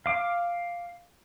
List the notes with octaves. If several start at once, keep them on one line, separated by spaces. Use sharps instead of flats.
F5 D6